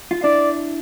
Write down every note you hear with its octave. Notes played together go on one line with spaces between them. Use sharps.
F4
D4 E4 D5